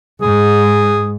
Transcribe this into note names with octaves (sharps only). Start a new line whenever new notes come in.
G#2 G#4